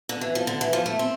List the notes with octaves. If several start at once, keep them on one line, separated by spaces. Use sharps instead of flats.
D3
E3
F3
D3
E3
F3
A3
C4